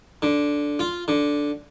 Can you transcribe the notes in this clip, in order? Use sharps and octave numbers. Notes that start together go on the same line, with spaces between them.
D3
F4
D3